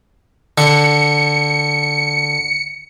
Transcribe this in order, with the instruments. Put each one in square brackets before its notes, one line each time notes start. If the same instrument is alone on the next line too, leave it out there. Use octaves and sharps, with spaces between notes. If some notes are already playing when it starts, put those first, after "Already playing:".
[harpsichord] D3 [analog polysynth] C#7